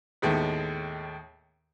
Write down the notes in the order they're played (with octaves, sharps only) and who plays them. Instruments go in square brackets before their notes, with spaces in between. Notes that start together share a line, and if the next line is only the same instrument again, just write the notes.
[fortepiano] D#2 A2 G#3 B3